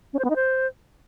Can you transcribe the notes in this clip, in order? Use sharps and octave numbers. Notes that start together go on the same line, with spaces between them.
C#4
C5
B3
D#4
C5